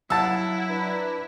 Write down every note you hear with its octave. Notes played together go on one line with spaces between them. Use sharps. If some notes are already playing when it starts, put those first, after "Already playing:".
F#3 E4 F5 F#5 A5 E6
D4 B4 A#5